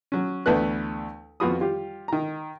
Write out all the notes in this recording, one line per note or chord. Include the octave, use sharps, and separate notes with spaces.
F#3 C#4
D2 E3 A3 B3 B4 F#6
F2 B3 F4 F#4 B5 D#6
G3 F4 G4
D#3 A#5